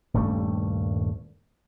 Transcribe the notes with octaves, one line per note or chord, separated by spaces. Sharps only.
D#1 G2 G3 A3